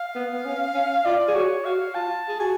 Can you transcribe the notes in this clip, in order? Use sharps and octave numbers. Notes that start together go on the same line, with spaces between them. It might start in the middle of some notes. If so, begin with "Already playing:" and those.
Already playing: F5
B3
B3
C#4
C#4
F4 D5
G#4
F#4 C#5
F#4 F5
F4 A5
G#4
F#4 G#5